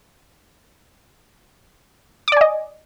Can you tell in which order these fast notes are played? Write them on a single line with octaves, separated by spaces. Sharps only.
D6 D5 G#5 D#5